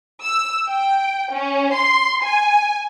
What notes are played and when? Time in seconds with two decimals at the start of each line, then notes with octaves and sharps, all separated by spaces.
0.22 E6
0.68 G5
1.32 C#4
1.74 C6
2.24 G#5